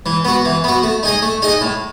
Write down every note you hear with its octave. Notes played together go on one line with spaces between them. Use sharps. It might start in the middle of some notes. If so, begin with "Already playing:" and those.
E3
B3 F#4
E3
B3 F#4
A3
D#4 G#4 D#5
A3
D#4 G#4 D#5
A2